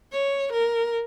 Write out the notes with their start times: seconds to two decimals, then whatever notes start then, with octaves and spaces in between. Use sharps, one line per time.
0.12 C#5
0.53 A#4